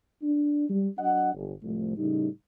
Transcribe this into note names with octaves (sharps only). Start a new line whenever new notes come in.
D4
G3
F#3 D4 D#5 F#5
G1
C2 A2 F3 A3
A2 C#3 G3 D#4